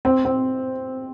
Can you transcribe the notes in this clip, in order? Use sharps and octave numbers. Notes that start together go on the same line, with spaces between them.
C4
C4